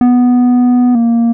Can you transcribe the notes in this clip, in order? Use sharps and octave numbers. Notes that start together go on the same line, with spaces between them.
B3
A#3